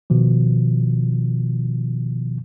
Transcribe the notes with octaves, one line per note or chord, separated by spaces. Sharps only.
B2 D#3 F3